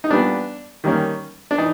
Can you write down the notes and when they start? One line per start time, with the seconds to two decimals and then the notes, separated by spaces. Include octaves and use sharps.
0.04 D#4
0.10 A#2 G3 B3 D4
0.84 D#3 G3 A#3 C#4
1.51 D4
1.58 E3 D#4